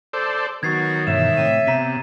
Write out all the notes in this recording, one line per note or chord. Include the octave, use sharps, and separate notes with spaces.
A4 C5 D5
D#3 F#3 B3 F#4 G#6 A6 C7
G2 B2 E3 C#5 E5 E7
A2 C3 G5 D#7
C3 B3 A#5 B6 D#7